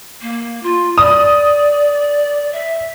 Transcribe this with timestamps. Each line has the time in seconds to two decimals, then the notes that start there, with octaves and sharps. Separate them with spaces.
0.21 A#3
0.63 F4
0.98 D5 D#6
2.52 E5